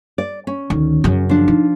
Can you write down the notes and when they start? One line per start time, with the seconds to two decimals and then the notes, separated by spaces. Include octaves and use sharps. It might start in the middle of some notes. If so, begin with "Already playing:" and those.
0.18 D5
0.47 C#4
0.70 D2 D#3
1.04 F#2 C#3
1.29 F3 D4
1.48 D#4